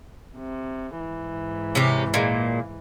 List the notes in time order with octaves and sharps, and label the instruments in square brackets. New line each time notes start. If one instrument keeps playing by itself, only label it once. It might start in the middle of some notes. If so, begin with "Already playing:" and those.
[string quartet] C3
G#2 E3
[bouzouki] C3 C#4 G4
A#2 G#3